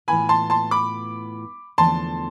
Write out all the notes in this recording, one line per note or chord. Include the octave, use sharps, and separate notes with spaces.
A2 E3 B3 F4 G#5 B5
A5 C6
A5 C6
B5 D6
E2 D3 F3 A3 A5 C6